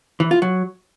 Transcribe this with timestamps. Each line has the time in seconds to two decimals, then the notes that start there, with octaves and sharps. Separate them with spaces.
0.20 E3
0.31 F4
0.42 F#3